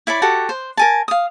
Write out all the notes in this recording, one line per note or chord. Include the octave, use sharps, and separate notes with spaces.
E4 C#5 D5 B5
F#4 G4 A4 F#5
C5
A#4 G#5 A5
F5 D#6